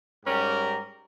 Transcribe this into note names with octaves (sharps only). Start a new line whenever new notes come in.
G#2 G3 C#4 G4 A#4